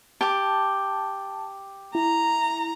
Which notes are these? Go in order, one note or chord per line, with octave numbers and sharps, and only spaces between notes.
G4 A5 D6
E4 A#5